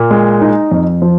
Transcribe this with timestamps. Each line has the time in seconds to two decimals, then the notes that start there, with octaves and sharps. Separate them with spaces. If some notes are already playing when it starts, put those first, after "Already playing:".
Already playing: A#2
0.11 G#3
0.41 D#4
0.71 F2
1.02 F3